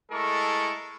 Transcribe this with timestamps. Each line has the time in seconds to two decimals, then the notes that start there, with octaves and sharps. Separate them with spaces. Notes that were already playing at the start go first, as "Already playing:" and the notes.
0.11 G#3 A3 E4 A4 A#4 C#6